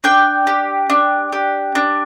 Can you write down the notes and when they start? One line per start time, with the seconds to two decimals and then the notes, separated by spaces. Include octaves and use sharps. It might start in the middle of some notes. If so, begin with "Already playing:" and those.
0.04 D4 G5
0.47 G4
0.90 D4
1.33 G4
1.75 D4